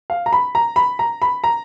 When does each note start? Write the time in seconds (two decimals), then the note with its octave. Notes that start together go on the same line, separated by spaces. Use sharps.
0.10 F5
0.26 A#5
0.33 B5
0.55 A#5
0.76 B5
0.99 A#5
1.22 B5
1.44 A#5